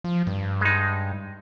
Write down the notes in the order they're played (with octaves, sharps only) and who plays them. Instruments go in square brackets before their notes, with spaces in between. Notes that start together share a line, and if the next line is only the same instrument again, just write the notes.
[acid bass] F3
G2
[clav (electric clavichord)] G#3 D#4